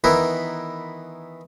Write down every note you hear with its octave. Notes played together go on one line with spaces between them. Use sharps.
D#3 E3 B3 E4 A#4